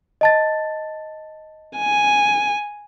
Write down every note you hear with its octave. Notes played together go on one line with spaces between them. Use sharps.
D#5 A5 A6
G#5